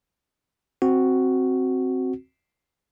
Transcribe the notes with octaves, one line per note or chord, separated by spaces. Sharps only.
C4 F#4